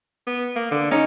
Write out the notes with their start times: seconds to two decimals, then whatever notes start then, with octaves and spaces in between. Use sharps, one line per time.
0.27 B3
0.56 A#3
0.71 D3
0.91 C#4 D#4